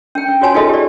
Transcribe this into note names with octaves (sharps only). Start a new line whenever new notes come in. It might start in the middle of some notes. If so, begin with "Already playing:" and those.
C#4 G5
C#4
F4 F#4 C#5 G#5 A5
D#4 F4 G#4 A4 D#5
G4 D5